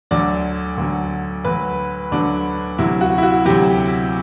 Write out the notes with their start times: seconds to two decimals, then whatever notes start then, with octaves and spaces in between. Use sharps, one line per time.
0.11 D2 D3 F#3 D5
0.78 D2 D3 F#3
1.45 D2 D3 F#3 B4
2.12 D2 D3 F#3 D4
2.78 D2 C3 F#3 E4
3.01 F#4
3.18 E4
3.23 F#4
3.46 D2 C3 F#3 G4